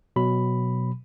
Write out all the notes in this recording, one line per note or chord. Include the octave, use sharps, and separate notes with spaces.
B2 F#3 B5